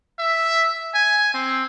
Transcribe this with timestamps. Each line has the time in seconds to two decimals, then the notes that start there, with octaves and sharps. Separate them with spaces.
0.19 E5
0.94 G#5
1.34 C4